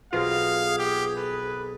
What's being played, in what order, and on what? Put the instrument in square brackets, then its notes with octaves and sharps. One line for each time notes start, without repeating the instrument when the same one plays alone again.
[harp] B1 B2 C4 [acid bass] F4 [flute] G#4 [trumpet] F5
[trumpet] G4
[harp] A4 [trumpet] B4